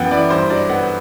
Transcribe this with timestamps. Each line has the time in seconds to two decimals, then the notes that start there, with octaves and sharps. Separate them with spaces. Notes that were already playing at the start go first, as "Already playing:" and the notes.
Already playing: F#2 E3 B3 F#5 G5
0.11 E4 D5
0.30 G2 C5
0.50 F#3 D5
0.69 B3 F#5